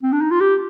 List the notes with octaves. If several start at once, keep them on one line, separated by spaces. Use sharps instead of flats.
C4
D4
D#4
F4
G4